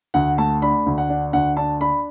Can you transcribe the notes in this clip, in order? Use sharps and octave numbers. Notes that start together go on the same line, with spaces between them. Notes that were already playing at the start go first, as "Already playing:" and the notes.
D2 F#5
A3 A5
D4 B5
D2
F#5
D4
D2 F#5
D4 A5
D4 B5